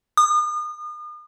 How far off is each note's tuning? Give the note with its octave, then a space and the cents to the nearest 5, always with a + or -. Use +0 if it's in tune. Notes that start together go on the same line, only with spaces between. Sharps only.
D#6 -40